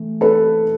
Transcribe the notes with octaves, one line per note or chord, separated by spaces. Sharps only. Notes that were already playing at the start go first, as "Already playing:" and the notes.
Already playing: E3 A3
A4 B4